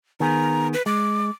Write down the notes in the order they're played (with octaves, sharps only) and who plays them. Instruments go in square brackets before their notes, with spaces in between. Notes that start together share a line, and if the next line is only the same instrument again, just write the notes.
[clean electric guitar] D#3 B3 G#4 [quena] A#5
[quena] B4
[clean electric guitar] G#3 [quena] D6